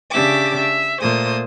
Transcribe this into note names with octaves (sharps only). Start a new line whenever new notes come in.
C#3 D4 G4 E5 D6
E5
A#2 A3 A#3 C5 D#6